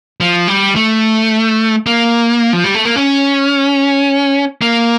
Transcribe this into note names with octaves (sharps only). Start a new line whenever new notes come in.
F3
G3
A3
A#3
F3
G3
A3
A#3
C#4
A#3